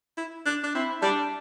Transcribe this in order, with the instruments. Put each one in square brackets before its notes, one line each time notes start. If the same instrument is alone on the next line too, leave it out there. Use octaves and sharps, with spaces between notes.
[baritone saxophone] E4
D4
D4
[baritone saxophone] C4 [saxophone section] E4
[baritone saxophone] G3 [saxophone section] D4